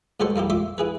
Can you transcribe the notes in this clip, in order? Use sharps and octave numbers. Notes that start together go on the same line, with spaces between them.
G#2 B2 G3 A4 C5 C#6
G2 A#3 E4 G4
A#2 E5 C6 D6
E4 G#4 B4